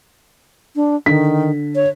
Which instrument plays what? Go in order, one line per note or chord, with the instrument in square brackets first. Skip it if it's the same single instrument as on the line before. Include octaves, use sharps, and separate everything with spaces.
[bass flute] D4
[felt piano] D3 B6 [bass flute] D#3
[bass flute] C#5